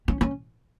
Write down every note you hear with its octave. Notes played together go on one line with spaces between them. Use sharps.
C#4
C#4